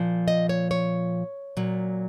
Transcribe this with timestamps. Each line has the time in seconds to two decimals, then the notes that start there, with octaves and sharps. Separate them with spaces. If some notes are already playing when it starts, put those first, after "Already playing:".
Already playing: A#2 F3
0.28 D#5
0.49 C#5
0.71 C#5
1.57 A#2 F#3